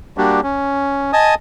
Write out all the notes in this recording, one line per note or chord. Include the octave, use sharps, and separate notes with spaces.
G3 A#3 D4 F#4 G4
C#4
D#5 G#5 A5 D#6